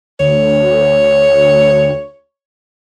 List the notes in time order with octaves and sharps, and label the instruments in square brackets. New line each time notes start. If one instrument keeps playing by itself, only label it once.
[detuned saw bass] D2 [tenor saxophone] C#5